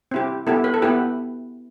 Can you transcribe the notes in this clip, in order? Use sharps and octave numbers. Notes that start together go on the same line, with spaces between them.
C4 E4 G4
B3 E4 G4 A4
B4
A4
B3 E4 G4 B4